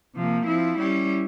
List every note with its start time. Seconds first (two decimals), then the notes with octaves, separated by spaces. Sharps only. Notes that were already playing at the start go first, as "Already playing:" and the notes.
0.15 C3 F3 A#3
0.47 F3 C4 E4
0.78 G3 C#4 E4 G4